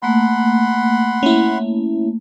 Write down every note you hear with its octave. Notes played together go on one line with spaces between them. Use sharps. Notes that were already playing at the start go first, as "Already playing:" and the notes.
A3 A#3 F#5 B5 C6
C#4 E4